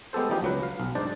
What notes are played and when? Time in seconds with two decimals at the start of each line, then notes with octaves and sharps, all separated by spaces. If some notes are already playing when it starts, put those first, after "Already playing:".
0.13 G#3 B3 G4 A4 C5
0.30 F3 G3 D#4 G4 A#4
0.42 C#2 F#3 B4
0.63 F5
0.80 B1
0.95 G#2 D4 D#4 C5 D5